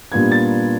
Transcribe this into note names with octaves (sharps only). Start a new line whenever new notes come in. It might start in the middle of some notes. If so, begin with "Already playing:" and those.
A#2 G3 B3 D4 F4 G#6
A6